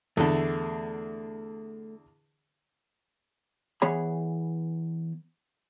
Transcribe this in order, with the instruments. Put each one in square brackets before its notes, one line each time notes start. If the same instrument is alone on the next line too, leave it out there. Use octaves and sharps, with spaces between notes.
[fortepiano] E2 D3 [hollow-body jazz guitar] A3 A4
[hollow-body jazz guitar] E3 B3 G#4 C#5 B5